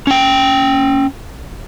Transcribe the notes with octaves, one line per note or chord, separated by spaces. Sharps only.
C#4 G5